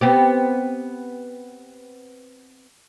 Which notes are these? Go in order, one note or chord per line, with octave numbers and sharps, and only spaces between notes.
B3 C4 G4